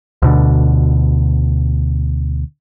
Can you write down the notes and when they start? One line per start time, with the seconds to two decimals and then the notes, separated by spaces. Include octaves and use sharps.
0.22 D2 B2 D3